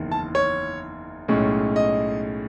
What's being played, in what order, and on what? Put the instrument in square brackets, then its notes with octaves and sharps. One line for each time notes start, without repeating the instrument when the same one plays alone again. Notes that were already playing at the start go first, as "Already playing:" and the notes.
Already playing: [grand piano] F#1 E2 D#3
A5
C#5
B1 A2 G#3 C#4
D#5